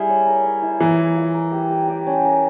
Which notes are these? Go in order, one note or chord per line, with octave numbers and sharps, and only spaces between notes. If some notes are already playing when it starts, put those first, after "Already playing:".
Already playing: G3 E4 G#4
C#5
A#4
C#5
E4
E3 A#4
A#4
F4
A#4
G4
G4
G4
C#4
A#4